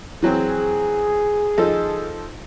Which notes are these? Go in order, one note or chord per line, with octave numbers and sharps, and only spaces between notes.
E3 F#3 C4 G#4
F3 D#4 A4